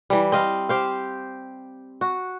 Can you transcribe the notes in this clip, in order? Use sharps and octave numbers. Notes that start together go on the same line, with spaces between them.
E3 G3
C4 D#5 F5
G4 C5 F5
F#4